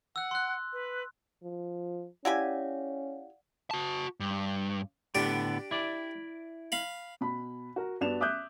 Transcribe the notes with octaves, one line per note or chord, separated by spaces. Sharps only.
F#5 E6 F#6
C6 F#6
B4
F3
C#4 E4 G4 D5 F5 F#5 G#5
F#4 A5
G2
A2 D3 B3 D4 G4
E4 D5
F5 B5
B2 B5
F#4 A#4
G2 B3 D4 F#4 E7 F7
E5 D6 D#6 F#6 G6